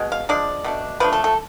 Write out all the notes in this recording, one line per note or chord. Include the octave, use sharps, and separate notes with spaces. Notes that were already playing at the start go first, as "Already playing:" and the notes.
Already playing: B2 G#3
F5
F3 G#3 D4 D5
B2 A3 D4
F3 A3 D4 B4
A4
A4